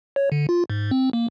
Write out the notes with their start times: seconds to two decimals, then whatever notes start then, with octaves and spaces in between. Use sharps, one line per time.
0.16 C#5
0.32 D3
0.49 F4
0.70 G#2
0.91 C4
1.13 A#3